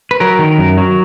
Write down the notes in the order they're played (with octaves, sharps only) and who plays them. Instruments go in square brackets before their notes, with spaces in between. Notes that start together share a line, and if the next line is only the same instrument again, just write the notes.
[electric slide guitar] B4
F#3 A#4
D#3
F#2
F#3